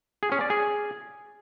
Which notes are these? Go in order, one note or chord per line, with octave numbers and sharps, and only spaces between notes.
G#4
C#4
D5
G#4